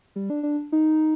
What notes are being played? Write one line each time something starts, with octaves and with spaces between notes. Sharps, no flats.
G3
D4
D4
D#4